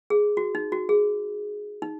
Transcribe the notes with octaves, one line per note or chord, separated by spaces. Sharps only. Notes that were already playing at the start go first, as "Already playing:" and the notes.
G#4
F#4
D#4
F#4
G#4
D#4